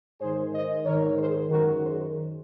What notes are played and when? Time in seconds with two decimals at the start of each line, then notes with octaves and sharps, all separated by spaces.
0.21 G#2 D#3 G#4 C5
0.53 C5 D#5
0.86 G#2 D#3 A#4 C#5
1.18 G#4 C5
1.50 F#2 D#3 F#4 A#4
1.82 G#4 C5